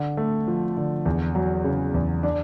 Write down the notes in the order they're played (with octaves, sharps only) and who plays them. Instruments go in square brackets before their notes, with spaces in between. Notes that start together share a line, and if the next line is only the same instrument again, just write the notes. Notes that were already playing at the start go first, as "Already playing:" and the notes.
Already playing: [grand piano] D3
A3
F3
D3
E2
F#3
C#3
E2
D4